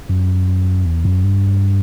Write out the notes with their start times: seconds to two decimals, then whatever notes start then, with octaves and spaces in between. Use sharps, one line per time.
0.09 F#2
0.86 E2
1.05 F#2
1.24 G2